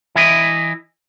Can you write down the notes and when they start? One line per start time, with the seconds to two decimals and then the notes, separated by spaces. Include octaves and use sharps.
0.15 E3 E4 D#5